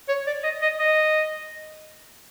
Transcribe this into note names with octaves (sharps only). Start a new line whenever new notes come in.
C#5
D5
D#5
D#5
D#5